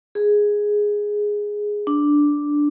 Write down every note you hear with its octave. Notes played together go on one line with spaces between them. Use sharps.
G#4
D4